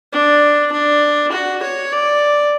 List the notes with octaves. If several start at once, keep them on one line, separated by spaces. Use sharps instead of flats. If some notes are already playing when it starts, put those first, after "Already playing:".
D4
D4
F#4
C#5
D5